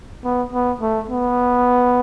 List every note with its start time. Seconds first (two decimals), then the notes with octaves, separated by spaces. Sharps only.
0.24 B3
0.53 B3
0.81 A3
1.10 B3